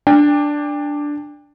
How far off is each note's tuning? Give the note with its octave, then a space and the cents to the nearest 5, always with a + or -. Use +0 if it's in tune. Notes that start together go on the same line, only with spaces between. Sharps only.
D4 +0 G5 +35